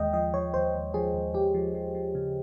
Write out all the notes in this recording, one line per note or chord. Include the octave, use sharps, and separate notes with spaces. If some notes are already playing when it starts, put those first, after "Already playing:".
Already playing: D#2 G#3 D#5 G5
F3 D#5
F3 C#5
D#2 C5
D#2
F3 G#4
D#2
D#2 G4
F3
F3
F3
C#3